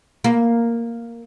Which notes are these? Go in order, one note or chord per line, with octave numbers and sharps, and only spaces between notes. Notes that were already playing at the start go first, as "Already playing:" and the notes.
A#3